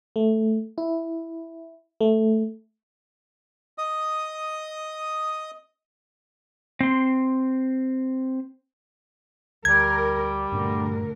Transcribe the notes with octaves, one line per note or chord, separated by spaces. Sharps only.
A3
E4
A3
D#5 D#6
C4 C6
D2 G3 A#4 G#6
D2 G2 A#2 D3 D4 A#4